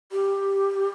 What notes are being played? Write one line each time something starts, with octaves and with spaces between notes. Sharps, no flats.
G4